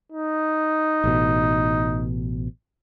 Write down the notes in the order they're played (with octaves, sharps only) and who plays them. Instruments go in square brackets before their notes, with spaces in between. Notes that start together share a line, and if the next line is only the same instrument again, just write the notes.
[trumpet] D#4
[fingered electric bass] A1 B2